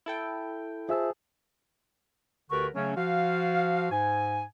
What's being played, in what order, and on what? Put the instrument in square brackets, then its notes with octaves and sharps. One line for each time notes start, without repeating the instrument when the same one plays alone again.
[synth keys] E4 A4 G5
[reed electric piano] F4 E5 E6 [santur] G#4 A5 [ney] C5
[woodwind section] D2 D3 G4 A#4 B4 C#6
C#3 F#3 A3 C#4
F3 F#4 F5
G#2 G#5